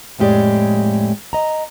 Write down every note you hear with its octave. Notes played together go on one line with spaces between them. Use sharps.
F2 A2 G#3 G4 G#4 D5
D#5 A#5